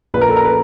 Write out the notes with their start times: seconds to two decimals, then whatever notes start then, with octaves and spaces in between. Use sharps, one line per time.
0.14 A#1 A#2 B4
0.21 A#4
0.29 A4
0.36 A#4
0.45 B4